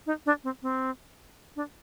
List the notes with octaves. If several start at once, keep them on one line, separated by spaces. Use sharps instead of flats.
D#4
D4
C4
C4
D4